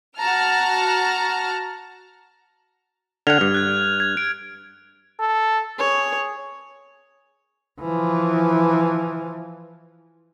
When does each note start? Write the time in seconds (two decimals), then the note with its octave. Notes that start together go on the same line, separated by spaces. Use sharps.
0.18 F#4 F#5 A5 A#5 F6
3.27 D3 F#5 F6 G#6 F7
3.41 G2
3.54 F#6 G#6
4.00 G#6
4.17 D7
5.20 A4
5.79 G#4 C#5
7.81 E3 F3